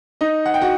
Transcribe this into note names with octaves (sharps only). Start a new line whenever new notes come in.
D#4 D#5
F#5
G5
F#4 F#5